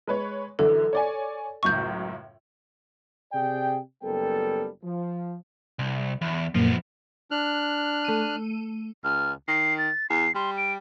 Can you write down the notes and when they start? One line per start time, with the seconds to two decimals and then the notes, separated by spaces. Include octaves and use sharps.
0.07 G#3 B4 C#5
0.59 F#2 D3 E3 A4
0.93 C#5 D5 G#5
1.63 C#2 F#2 A2 C#6 G6
3.33 C3 G#4 D5 G5
4.03 F#1 G3 B3 A4 A#4 G5
4.83 F3
5.79 C2
6.21 E2
6.55 F#2 A#2 F3 A#3 B3
7.31 D4 F6 F#6
8.05 A3 D#7
9.04 C#2 F6
9.48 D#3 C7
9.78 A6
10.10 E2 C7
10.35 G3 C6
10.58 D7